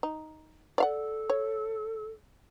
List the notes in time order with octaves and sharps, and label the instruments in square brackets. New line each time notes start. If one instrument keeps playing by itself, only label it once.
[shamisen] D#4
[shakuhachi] A4 [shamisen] D5 F5 F#5
[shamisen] C#5